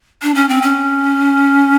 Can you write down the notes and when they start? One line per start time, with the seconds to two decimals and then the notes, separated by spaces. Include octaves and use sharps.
0.22 D4
0.35 C#4
0.49 C4
0.62 C#4